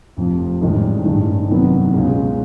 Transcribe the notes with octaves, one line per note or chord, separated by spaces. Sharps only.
F1 F2 C3 F3
A1 G#2 D#3 G3
A1 G2 D#3
F2 C3 D#3 F#3 B3
C#2 B2 G#3 C#4